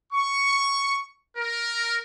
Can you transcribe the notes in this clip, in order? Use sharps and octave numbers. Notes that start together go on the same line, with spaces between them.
C#6
A#4